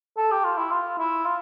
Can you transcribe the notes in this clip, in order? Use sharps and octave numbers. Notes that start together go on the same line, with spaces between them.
A4
G4
F4
E4
F4
E4
F4